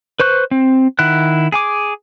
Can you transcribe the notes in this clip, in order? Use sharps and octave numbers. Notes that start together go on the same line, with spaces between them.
B4 C5 C#6 F#6
C4
D#3 E4 F#5 F#6
G#4 G#5 D6